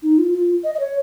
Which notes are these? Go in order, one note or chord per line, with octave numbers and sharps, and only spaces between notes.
D#4
F4
F4
D#5
D#5
C#5